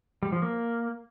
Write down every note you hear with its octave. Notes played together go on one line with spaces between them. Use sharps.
G3
F3
A#3